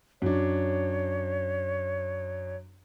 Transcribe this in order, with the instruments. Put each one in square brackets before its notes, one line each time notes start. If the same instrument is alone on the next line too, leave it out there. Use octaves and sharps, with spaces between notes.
[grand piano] F#2 D4 [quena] C#5